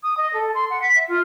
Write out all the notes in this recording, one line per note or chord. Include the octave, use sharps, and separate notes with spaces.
D#6
D#5
A4
C6
F#5
B6
E5
F4